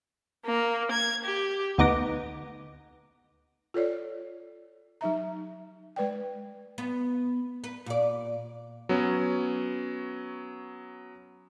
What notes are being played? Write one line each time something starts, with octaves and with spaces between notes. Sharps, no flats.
A#3
G#6
G4
D2 B3 D#4 D6 A#6
F4 A4 C#5 D5
F#3 D#4 E5 A#5
G#3 B4 D5 G5
B3
B4
A#2 D5
F#3 B3 C#4